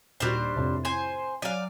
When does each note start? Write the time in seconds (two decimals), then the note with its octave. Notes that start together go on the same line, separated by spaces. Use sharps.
0.20 D#2 A#2 G3 D4 F#4 C5
0.56 F2 A2 C3
0.85 C5 G#5
1.42 F#3 D5 F5 G#5